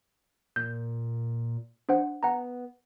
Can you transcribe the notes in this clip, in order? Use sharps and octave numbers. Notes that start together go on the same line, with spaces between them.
A#2 G6
D4 C5 F#5
B3 F#5 A#5